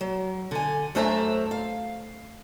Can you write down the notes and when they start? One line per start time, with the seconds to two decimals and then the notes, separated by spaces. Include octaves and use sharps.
0.01 F#3
0.51 D3 G#5
0.95 F#2 A3 D4 C5 E5 A#5
1.51 F5